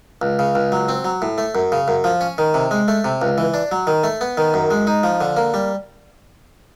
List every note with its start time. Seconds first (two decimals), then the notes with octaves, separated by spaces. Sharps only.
0.22 C#2
0.39 C#3
0.55 C#2
0.72 F#3
0.88 C4
1.05 F#3
1.22 A2
1.38 A3
1.55 F#2
1.72 C#3
1.88 F#2
2.04 F3
2.21 C#4
2.38 D#3
2.54 C3
2.71 G#3
2.88 A3
3.04 C3
3.22 C#2
3.38 E3
3.54 D4
3.72 F#3
3.87 D#3
4.04 A3
4.21 B3
4.37 D#3
4.54 F#2
4.71 G#3
4.87 D#4
5.03 F3
5.21 D3
5.37 A#3
5.54 G3